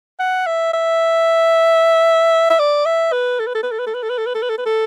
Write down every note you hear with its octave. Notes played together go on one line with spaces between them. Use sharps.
F#5
E5
E5
E5
D5
E5
B4
A4
B4
A4
B4
A4
B4
A4
B4
A4
B4
A4
B4
A4
B4
A4
B4
A4